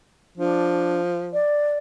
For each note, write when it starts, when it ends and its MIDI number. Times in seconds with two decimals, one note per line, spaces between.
0.38 1.38 53
0.38 1.00 62
1.33 1.78 74